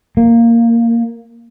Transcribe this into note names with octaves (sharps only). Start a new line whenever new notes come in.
A#3